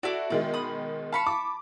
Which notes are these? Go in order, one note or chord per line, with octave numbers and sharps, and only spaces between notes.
E4 F#4 A4 D5
B2 D#3 G#3 D5
B5 D#6
F5 A5 B5 C#6
D6